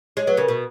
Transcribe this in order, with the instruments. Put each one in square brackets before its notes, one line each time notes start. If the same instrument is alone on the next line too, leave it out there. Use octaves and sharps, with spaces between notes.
[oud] G#3 [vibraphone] C#5
[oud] F#3 [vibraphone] B4
[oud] C#3 [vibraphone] A#4
[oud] B2